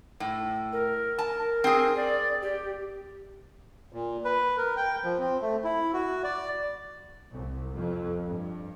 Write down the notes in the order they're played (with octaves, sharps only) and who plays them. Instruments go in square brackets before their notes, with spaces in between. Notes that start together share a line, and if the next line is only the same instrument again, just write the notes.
[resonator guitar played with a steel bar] A2
[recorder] A#4
[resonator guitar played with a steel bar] A5
C4 G#4
[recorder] D5
G4
[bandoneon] A#2
B4
A#4
G5
F3
C4
A3
E4
F#4
D5
[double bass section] C2
F2
G2